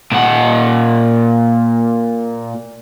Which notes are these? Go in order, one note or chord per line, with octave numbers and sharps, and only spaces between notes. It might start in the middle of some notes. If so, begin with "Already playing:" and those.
A#2 F#5